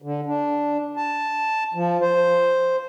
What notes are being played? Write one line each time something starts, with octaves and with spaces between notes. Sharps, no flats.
D3
D4
A5
F3
C5